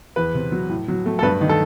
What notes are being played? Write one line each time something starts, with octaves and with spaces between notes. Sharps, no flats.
E2 B4
C3
F#3
A2
F#3
A3
A4
G2 B4
D#3
A4